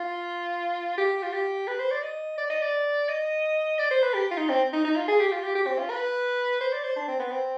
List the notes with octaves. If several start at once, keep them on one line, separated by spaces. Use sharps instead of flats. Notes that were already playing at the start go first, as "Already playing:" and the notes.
Already playing: F4
G4
F4
G4
B4
C5
D5
D#5
D5
D#5
D5
D#5
D5
C5
B4
G4
F4
D#4
C4
D#4
D#4
F4
G#4
G4
F4
G4
G4
C4
F4
B4
C5
D5
C5
D4
C4
B3
C4